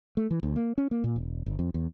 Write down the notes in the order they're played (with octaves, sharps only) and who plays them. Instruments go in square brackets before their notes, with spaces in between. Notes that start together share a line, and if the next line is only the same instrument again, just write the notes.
[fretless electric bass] A3
E3
D2
A#3
C#4
A#3
A#2
E1
G1
F2
E2